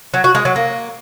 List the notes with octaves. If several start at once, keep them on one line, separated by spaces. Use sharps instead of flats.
F#3
F#4
G#3
F#3
A#3